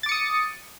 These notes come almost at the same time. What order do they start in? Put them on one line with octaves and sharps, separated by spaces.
A6 D6 C#7 D#6